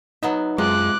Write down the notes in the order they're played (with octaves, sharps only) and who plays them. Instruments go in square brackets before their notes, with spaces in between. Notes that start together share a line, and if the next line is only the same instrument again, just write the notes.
[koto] F#3 B3 E5 [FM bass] D#4
[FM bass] F#2 [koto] C3 [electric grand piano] G#3 F4 [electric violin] D6 F#6